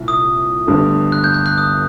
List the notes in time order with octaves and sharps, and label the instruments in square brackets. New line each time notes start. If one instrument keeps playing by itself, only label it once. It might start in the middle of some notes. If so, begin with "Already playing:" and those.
Already playing: [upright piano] C2 A#2
[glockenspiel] D#6
[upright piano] G1 G2 D3 A3
[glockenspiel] F#6
G6
G6
F#6
D#6